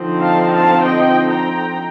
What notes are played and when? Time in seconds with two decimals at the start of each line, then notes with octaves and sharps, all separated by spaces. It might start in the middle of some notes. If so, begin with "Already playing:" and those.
Already playing: D3 F3 C4 D#4
0.21 F5 A5
0.52 F5 A5
0.82 D#5 G5
1.29 G5 A#5